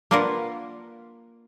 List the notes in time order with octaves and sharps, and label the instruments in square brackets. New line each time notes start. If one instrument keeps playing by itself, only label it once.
[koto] A#3 D4 F4 A#4 B4 F#5